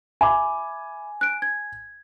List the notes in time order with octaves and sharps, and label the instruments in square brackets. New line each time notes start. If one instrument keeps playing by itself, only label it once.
[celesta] E5 B5 D6 [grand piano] G#5
[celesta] F#6 D7
G#6